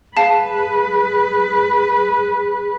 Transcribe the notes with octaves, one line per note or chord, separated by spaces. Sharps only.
G#4 B4 F5 A5